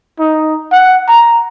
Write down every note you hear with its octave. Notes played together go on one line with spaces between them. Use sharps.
D#4
F#5
A#5